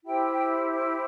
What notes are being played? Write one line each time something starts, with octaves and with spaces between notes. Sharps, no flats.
E4 G4 C5 G5
G5